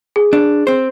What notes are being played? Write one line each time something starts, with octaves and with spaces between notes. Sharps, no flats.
G#4
D4
C4 C5